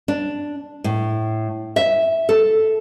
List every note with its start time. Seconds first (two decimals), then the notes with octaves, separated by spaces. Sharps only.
0.08 D4
0.84 A2
1.76 E5
2.29 A4